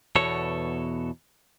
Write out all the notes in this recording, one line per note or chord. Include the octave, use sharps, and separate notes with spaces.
E2 B2 A4 C#5